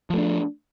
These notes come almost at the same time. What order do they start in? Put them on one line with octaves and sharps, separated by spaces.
F3 A3 D4